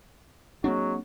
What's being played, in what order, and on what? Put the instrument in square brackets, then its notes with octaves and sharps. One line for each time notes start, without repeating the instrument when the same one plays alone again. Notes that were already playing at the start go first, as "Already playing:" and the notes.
[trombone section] F#3 G#3 F#4 [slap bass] A#3 C4 D4